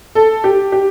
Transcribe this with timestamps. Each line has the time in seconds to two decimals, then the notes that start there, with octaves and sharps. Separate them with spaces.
0.15 A4
0.44 G4
0.72 G4